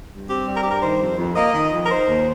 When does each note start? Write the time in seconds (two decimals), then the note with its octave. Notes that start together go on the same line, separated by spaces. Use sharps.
0.10 G2
0.28 C4 G4
0.46 G3
0.55 A#4
0.62 G2 G4
0.69 A#4
0.81 D#3 C5
1.00 F2
1.17 F2
1.36 A#3 D#5
1.54 D#3
1.72 F2
1.85 A#4
1.91 D#3 C5
2.08 D#2